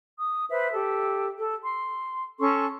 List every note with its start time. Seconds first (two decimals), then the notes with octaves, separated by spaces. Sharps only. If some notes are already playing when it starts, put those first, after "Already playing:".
0.18 D#6
0.50 B4 C5 E5
0.72 G4 A4
1.38 A4
1.63 C6
2.39 C#4 A4 C6 C#6